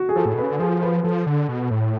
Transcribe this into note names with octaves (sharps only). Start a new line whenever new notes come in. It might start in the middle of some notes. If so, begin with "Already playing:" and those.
Already playing: F#4
G#4
F3 A4
A2
B2
B4
C#3
D3
F3 G#4
B4
F3 A4
D3
B2
A2